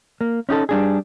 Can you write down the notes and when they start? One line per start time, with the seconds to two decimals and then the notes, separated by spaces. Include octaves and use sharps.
0.21 A#3
0.49 C#4 D#4 G4 A4
0.69 G3 D4 G#4